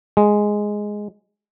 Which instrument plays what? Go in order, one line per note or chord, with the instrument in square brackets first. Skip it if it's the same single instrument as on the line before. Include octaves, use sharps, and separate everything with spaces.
[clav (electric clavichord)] G#3